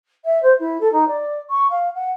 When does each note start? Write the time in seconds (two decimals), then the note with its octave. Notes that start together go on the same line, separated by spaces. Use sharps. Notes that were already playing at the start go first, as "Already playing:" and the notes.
0.24 E5
0.42 C5
0.59 E4
0.80 A4
0.92 D#4
1.07 D5
1.49 C#6
1.70 F5
1.94 F#5